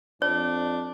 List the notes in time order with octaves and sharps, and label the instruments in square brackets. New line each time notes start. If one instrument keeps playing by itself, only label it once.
[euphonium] F2 [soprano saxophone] D4 [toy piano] C#5